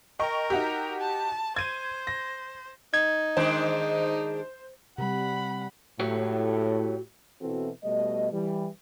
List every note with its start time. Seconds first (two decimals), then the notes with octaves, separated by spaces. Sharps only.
0.19 A#4 D#5 G5 C#6
0.50 D#4 F#4 G4
1.00 A5
1.56 C5 G#6 D#7
2.07 A#6
2.94 D#4 G#6
3.37 D#3 G#3 D4 C5
4.98 C3 G3 F#5 B5
6.00 A2 F#4 G4 C#5
7.42 B2 E3 C4 E4 F#4 A4
7.84 B2 G3 A3 D#5
8.32 E3 G3